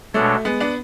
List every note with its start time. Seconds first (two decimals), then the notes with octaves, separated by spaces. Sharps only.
0.14 B2 G#3 A3 D4 A4 C#5
0.45 G#3 B3
0.60 B3 D4